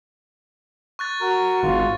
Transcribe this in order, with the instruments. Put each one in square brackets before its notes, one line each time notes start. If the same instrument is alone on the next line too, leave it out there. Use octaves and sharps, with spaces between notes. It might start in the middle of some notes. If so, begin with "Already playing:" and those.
[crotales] C#6 F#6 A6
[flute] F#4 [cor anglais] A#4
[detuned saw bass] G#1 [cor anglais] F4